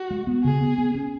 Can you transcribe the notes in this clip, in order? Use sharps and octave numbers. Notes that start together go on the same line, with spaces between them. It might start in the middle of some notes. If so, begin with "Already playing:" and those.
Already playing: F#4
G#3
B3
C#3 G#4
B3
B3
C#4